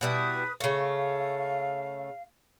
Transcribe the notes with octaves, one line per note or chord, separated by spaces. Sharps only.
B2 G3 E4 B4 D#6
C#3 A3 F5